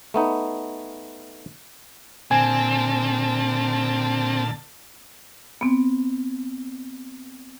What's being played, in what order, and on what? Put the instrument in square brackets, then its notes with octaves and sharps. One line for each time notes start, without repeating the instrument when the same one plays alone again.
[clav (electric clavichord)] A3 B3 D#4
[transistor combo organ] A#2 D3 A5 [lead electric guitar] C4 [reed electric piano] G#5
[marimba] B3 C4